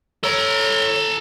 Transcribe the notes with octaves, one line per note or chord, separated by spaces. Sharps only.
A4 C#5 A#5 E6